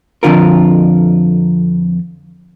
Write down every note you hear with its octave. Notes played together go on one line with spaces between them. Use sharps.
F2 A#2 D3 F4 A#4